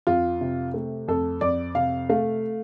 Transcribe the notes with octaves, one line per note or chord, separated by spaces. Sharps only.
F2 F4
C3
A3
F2 A4
F2 D5
C3 F5
A3 F5